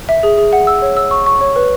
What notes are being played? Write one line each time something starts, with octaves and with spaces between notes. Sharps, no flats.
E5
G#4
G#4
F#5
E6
C#5
E6
C#6
C#6
C#5
B4